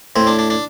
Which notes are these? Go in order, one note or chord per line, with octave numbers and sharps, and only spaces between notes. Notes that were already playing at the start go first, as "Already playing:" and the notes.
A2 C4
D4
D4
D4